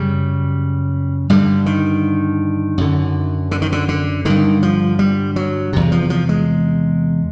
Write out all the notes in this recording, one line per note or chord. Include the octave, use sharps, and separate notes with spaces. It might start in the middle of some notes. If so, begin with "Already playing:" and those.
Already playing: F#2 C#3 G3
G2 D3 G3
D#3
F#2 D3
D3
D#3
D3
D3
G2 D3 D#3
F3
G3
F#3
E2 C3
F3
F3
G#3